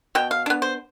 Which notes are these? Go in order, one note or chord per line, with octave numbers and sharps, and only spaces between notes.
B2 G5
F5
B3 D4
C5